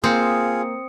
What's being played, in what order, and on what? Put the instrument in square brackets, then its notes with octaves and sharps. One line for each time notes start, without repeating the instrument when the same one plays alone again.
[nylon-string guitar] A#3 [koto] C4 [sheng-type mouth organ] F4 G#4 [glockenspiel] D#6 C#7